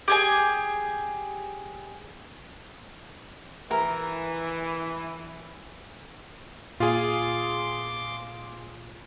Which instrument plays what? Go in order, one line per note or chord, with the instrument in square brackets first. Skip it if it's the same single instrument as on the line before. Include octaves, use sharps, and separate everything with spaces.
[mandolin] G4 G#4 G#5
[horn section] E3 [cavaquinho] A#4
[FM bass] A#2 [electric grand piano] F4 G#4 F5 [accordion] C6 D6